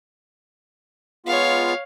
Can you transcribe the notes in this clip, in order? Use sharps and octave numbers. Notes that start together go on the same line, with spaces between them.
G#3 B3 F4 C#5 F5